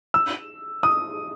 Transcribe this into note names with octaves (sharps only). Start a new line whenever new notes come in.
E6
D#6